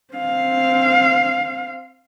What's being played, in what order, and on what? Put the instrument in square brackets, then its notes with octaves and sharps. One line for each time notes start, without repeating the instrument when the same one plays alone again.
[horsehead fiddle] C4 F5